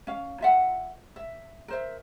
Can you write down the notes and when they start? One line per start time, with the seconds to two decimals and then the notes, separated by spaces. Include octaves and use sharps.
0.07 C#4 F5
0.41 F4 E5 F#5
1.16 E5
1.68 A#4 C5 E5